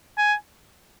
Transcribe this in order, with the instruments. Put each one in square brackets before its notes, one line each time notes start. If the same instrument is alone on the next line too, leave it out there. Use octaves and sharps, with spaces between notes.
[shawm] G#5